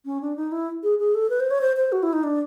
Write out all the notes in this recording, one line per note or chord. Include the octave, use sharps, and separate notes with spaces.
C#4
D4
D#4
E4
G#4
G#4
A4
B4
C5
C#5
C5
C5
F#4
E4
D#4
D4